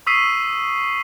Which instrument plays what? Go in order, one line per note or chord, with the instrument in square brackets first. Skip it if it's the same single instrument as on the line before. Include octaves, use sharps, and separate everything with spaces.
[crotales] C#6 D#6 E6 B6 C7 D#7